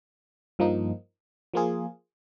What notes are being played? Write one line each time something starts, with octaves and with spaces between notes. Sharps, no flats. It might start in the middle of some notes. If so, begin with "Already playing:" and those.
G2 F3 A#3 D#4
F3 A#3 F4 G#4